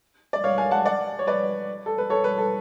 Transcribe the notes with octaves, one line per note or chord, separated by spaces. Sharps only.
D5
C#5 F5
F5 G#5
F#5 A5
D5 F#5
C#5
B4 D5
A4
B4
A4 C#5
B4
A4